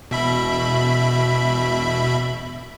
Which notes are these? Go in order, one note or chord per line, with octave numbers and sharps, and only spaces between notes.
E1 B2 E5 B5